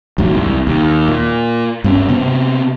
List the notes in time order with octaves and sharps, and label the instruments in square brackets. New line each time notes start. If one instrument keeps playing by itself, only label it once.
[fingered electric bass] A#1 D#2 G#2 F#3
C2
D#2
A#2
G2 C4 C#4
C3 B3 C4